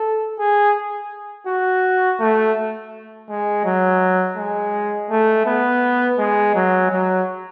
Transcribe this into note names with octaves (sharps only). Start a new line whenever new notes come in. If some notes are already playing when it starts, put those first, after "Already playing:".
Already playing: A4
G#4
F#4
A3
G#3
F#3
G#3
A3
B3
G#3
F#3
F#3